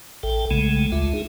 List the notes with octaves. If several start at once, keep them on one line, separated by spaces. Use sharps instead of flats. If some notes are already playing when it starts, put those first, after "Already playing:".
A1 A4 G5
B1 C#3 G#3 A3
D2 F4 E5
D#4 G#4